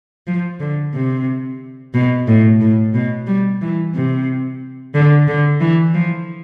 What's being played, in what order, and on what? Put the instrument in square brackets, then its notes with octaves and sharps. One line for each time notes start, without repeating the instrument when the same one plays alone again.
[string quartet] F3
D3
C3
B2
A2
A2
B2
G3
E3
C3
D3
D3
E3
F3